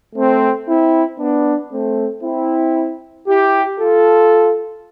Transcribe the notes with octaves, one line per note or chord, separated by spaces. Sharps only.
A3 C4
C4 E4
B3 D4
A3 C4
C4 E4
E4 G4
F4 A4